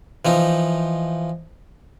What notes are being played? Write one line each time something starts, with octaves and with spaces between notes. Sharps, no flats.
E3 F3 D#4